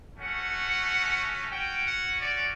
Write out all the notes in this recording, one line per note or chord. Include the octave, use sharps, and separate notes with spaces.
A3 C#4 F#4 F#5
C#4 F#4 G5
F#5
D5